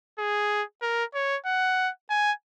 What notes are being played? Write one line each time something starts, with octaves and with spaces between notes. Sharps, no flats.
G#4
A#4
C#5
F#5
G#5